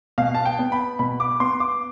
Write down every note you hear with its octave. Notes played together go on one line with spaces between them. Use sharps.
B2 F5
A5
G5
B3
B5
B2 B5
D6
B3 C6
D6